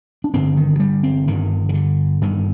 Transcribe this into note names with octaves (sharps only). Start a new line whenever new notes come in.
D4
G1 G2 D3 C4
D#3
G3
C4
G1 G2 D3 D#3
D#3
D3
G1 G2 D3 D#3